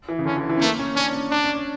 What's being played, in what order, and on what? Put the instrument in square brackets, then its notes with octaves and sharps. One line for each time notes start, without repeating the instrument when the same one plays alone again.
[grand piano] E3
C#3
[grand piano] D3 [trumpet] C#4
[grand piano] E3
E3
C#4
[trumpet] A3 [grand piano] A#3
[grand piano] C#4
[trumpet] C#4 [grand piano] D4
[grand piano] C#4
[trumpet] D4
[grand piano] C#4
D4